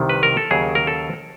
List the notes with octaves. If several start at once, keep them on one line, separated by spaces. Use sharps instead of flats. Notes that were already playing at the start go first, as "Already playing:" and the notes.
Already playing: C2 C3 D#3
B4
A#4
A4
D#2 C#3 F#3 G#4
A#4
A4